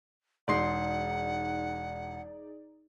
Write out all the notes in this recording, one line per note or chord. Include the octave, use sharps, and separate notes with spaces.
E1 D#4 G#4 D5 F#5 C6 C7